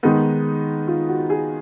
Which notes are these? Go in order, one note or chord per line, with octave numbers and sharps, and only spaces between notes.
D#3 G#3 B3 D#4
F4
F#4
G#4